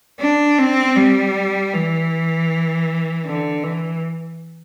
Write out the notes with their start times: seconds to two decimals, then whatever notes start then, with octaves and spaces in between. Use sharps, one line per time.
0.19 D4
0.58 C4
0.96 G3
1.73 E3
3.26 D3
3.64 E3